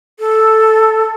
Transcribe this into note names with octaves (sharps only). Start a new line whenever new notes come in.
A4